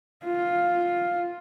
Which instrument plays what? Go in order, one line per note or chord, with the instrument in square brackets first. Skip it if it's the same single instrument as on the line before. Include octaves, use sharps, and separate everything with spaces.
[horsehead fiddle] F4